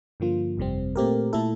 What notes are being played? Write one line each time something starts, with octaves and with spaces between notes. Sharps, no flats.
G2 D3 F3 A#3 F4
G1 F2 C3 G3 C4
A#2 A3 C4 G4 A#4
A#2 A3 E4 A4